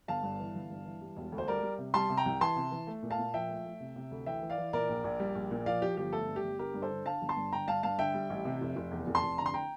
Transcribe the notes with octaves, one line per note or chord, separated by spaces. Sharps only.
G1 F5 A5
G2
E3
G1
G2
E3
G3
E1
D2
C5
G3 A#4 D5
G3
C3
G3 A5 C6
C3
G5 A#5
C2
E3 A5 C6
C3
E3
A3
A#2
F5 A5
A#2
F3 E5 G5
A3
A3
C3
C3
D2
E3 E5 G5
E3
D5 F5
E3
A#2 A#4 D5
A#1
A#1
G3
A#1
A#2
F3 D5 F5
F3 G4
G1 G4
A3 A4
G2
G4
G1
D3 G4 A#4
G2
A4 C5
D3
D3 F5 A5
G1
A5 C6
G2
D3 G5 A#5
G2 F5 A5
G2 F5 A5
D3 E5 G5
G3
A1
C3
F1
F1
E2
F1
A5 C6
F1
D3 A#5
C6
G5 A#5